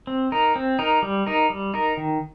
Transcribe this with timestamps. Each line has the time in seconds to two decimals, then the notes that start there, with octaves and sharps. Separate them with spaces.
0.07 C4
0.32 D#4 A#4
0.56 C4
0.79 D#4 A#4
1.02 G3
1.27 D#4 A#4
1.50 G3
1.74 D#4 A#4
1.97 D#3